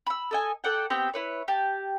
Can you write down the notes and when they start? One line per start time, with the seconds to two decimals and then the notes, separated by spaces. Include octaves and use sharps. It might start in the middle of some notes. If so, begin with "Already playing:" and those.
0.07 B5 E6
0.31 A4 D#5 G#5
0.64 A4 D5 F#5 G5
0.90 B3 C4 G4 G5
1.14 E4 B4 C#5
1.48 G4 A5